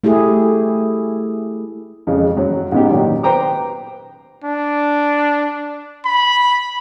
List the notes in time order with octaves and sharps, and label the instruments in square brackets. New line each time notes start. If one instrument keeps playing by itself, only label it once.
[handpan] A3 E4 G4 G#4
[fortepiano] F2 C#3 G#3
F#2 F#3
G#2 C#3 B3 D#4 G4
A#2 D#3 F#3
B4 C5 G5 A#5 D6
[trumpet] D4
B5